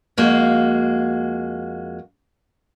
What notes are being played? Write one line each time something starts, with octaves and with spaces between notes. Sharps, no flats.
F2 G#3 A#3 F#4